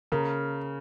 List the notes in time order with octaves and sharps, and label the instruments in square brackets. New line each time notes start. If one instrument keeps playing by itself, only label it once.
[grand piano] C#3 [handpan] A#4